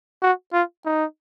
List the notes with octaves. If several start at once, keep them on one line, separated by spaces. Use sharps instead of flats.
F#4
F4
D#4